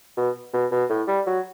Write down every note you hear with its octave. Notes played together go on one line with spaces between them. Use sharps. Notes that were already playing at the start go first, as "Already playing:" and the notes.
B2
B2
B2
A2
G3
F#3